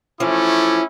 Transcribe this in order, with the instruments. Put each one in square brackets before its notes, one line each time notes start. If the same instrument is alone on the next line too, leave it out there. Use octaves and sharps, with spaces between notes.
[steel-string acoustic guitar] E3 F3 [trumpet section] A3 C#4 D6 [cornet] E4